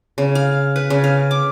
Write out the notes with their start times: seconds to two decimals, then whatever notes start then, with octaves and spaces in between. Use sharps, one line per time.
0.18 C#3
0.35 F5
0.76 B4
0.90 C#3
1.04 F5
1.31 D6